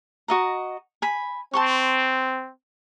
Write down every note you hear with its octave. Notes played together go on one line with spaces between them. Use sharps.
F#4 D#5 A#5
G#5 B5
C4 A5 C6 C#6